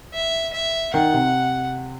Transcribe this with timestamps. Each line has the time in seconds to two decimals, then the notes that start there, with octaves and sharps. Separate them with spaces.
0.13 E5
0.53 E5
0.94 D#3 F#5
1.13 C3